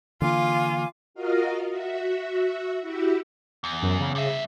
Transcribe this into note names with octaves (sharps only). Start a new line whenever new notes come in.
D3 E3 A#3 F4 F5 G#5 D6
F4 F#4 A#4 D#5 F5
F#4 E5
E4 F#4 G4 E5
E2
F#2
C#3
G2 E5